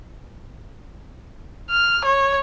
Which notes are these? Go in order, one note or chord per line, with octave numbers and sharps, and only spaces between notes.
F6
C#5